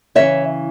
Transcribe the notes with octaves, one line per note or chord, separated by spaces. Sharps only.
C#3 E3 C#5 E5